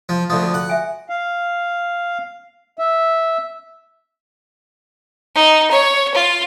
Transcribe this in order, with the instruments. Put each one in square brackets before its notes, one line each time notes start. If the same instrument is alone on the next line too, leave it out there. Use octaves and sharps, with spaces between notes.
[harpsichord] F3
[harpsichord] D2 F3 [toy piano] D#6
[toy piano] F#4 A4
[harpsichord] F#5
[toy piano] E5 G#5
[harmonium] F5
E5
[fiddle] D#4
C#5
F4